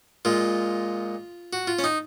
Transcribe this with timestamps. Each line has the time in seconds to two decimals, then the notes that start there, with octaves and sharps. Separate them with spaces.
0.25 A#2 G#3 F4
1.53 F#4
1.67 F4
1.79 C#4
1.84 D#4